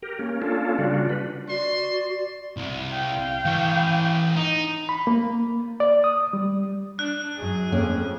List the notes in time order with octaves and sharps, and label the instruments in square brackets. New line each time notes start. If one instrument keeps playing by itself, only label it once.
[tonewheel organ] G4 A#4
A#3 C#4
A#3 C#4 D4 F4 A4
C#3 G3 D4 F4 F#4
B4
[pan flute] F#4 [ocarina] D5 [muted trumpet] C6
[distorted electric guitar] C2
[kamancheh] F5 G5
[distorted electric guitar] E3 C#5
D#4
[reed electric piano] B5
A#3
D5
D#6
G3
[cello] D4 [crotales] F#6
[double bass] F#2 [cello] G#4
[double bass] F2 [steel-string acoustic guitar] A#3 C#4